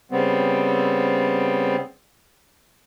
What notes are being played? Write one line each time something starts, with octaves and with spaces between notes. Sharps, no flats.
C#3 G3 B3 C4